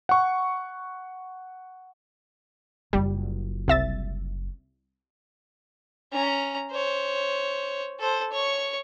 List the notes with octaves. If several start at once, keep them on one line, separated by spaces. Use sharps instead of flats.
F#5 C#6
F#1 G3 F4
C2 E5 A6
C#4 A#5
C5 C#5
A4 C5
C#5 C#6